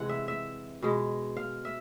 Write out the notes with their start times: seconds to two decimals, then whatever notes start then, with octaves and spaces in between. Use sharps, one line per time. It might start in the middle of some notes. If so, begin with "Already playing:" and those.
Already playing: C3 E3 G#3 F#5
0.09 E5
0.28 E5
0.82 B2 G#3
1.37 F5
1.65 E5